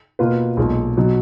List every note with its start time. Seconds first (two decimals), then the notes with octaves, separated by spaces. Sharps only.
0.19 B2 A#3 F4 B4
0.57 B1 A#2 G#3
0.97 B2 F#3